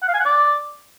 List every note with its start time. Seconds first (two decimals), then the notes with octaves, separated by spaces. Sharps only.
0.03 F#5
0.08 F5
0.14 G#5
0.20 F#5
0.25 D5